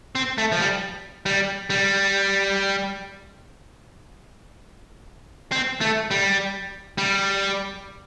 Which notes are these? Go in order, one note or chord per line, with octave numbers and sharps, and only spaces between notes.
C4
A3
F3
G3
G3
G3
C4
A3
G3
G3